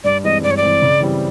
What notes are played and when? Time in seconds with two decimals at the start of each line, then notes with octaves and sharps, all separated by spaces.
0.04 G2 D5
0.24 E3 G#3 C4 D#5
0.43 G2 D5
0.51 C#5
0.57 D5
0.62 E3 G#3 C4
0.82 C#3
1.00 E3 G3 C4 E4